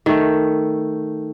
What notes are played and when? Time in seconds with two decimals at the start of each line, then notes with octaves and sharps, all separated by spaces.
0.06 D#3 A3